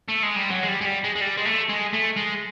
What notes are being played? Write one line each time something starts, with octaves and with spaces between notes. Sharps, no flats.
A3
G#3
G3
F#3
G#3
G3
G#3
G3
G#3
G#3
G3
G#3
A3
G#3
A3
G#3